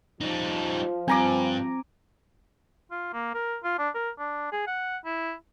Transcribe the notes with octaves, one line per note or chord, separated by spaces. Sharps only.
F3 G3 D#4
G2 C4 G#5 A#5 D6
F4
A#3
A#4
F4
D4
A#4
D4
G#4
F#5
E4